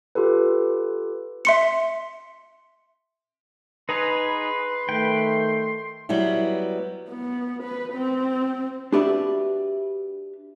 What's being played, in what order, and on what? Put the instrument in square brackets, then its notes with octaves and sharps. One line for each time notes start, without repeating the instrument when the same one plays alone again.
[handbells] F4 G4 A4 B4
[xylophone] E5 C6 C#7
[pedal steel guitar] D#4 G#4 A#5 [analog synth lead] B4 [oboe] C6
[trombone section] D#3 A3 [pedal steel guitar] G5
[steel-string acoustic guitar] F#3 G3 B3 E4
[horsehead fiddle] B3
B4
C4
[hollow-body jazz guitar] D4 F#4 G4 B4 D5 E5